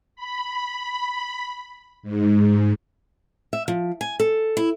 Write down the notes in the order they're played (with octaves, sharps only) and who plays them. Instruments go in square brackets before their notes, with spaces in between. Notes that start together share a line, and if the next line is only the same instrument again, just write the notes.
[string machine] B5
G#2
[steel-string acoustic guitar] E5
F3
G#5
A4
E4